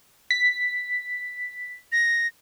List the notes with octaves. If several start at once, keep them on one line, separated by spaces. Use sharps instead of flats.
B6
A#6